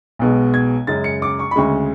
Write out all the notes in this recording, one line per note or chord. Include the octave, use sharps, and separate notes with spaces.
B1 B2 G#3
G#6
F#2 C#3 G#3 A6
C#7
D6
C#6
B5
D2 C#3 G#3 C#6